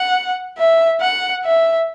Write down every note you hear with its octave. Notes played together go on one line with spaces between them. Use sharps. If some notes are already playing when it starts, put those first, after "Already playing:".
Already playing: F#5
E5
F#5
E5